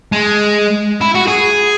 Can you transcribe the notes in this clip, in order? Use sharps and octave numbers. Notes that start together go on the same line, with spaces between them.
G#3
E4
F#4
G#4